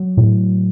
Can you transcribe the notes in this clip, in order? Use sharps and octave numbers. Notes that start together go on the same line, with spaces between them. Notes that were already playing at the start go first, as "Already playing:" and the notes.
Already playing: F#3
A2